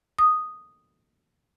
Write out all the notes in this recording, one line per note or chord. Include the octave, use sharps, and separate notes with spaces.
D#6